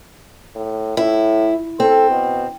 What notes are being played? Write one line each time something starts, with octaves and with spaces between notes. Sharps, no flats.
A2
A2 E4
C4 A4
B2